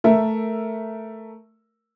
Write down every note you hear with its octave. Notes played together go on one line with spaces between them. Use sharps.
A3 A#4 E5